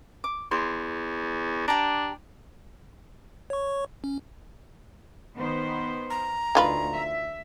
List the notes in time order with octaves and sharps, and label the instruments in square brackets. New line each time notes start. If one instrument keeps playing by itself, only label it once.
[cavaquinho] D6
[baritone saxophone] E2 [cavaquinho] C6
[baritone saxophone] D4 [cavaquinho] G4 A5 A#5
[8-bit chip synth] C#5 C#6
C#4
[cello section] D#3 B3 C5
[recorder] A#5
[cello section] D2 [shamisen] D#3 F4 B4
[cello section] E5